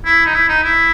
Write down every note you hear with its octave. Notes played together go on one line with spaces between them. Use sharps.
E4
D#4
E4
D#4
E4